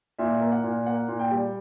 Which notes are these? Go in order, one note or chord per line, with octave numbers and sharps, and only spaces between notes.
A#2 E5
A#3
F#5
A#2
A#3 F#5
A#2
G5
G3